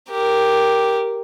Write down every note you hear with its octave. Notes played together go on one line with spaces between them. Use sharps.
G4 A#4